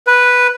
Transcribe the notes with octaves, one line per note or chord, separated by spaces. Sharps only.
B4